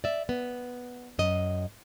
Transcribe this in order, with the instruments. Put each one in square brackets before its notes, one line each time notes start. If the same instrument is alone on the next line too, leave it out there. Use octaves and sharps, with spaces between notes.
[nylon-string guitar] D5 E5
B3
F#2 D#5